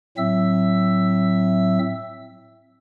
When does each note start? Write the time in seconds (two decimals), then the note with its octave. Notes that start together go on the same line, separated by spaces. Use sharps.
0.18 A2 F#3 C4 E5 E6